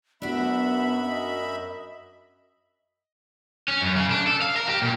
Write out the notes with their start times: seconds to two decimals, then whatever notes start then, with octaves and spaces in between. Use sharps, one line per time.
0.22 F#2 B3 D4 F#4 E5 B5
1.06 D#5
3.68 C#4
3.81 F#2
3.96 C#3
4.11 D4
4.27 A4
4.41 F5
4.56 A#4
4.69 G4
4.82 A#2